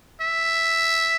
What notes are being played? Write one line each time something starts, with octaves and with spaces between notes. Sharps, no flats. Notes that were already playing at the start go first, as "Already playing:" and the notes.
E5